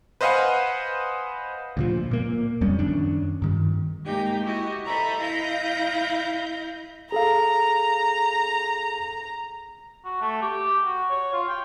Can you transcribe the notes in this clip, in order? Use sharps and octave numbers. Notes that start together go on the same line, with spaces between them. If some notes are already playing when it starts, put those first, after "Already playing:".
B4 C5 D#5 F5 F#5 G#5
D2 A#2 F3
A#2 A#3
D1 F2 G3 C#4
F#2 D#3 C#4 D4
G2 D#3
G#3 A#3 D#4 G4 G5
E4 F#4 G4 D#5
A4 C5 D#5 E5 A#5 B5
E4 D#5 F5 B5 G6 A#6
G#4 A4 F5 A#5
F#4
A3
G4
F#4
C#5
F4
G5